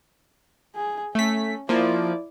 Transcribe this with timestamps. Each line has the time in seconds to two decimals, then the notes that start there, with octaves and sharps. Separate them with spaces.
0.76 G#4
1.15 A3 C#4 B6
1.69 F3 A#3 E4 D5